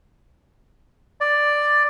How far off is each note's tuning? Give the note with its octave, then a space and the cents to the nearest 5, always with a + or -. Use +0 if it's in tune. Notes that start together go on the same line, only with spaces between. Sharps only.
D5 +5